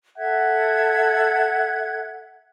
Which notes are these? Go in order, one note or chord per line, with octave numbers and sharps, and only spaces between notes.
A4 E5 F#5 G#6